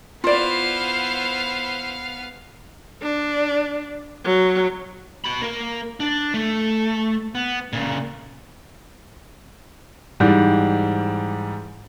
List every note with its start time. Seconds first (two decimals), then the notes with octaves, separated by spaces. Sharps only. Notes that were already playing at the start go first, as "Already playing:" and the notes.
0.24 B3 E4 F4 C5 D5 F5
3.02 D4
4.25 F#3
5.24 F#4 B5
5.41 A#3 A#4
6.00 D4
6.34 A3
7.35 B3
7.73 A#2 C#3
10.20 G#2 E3 G3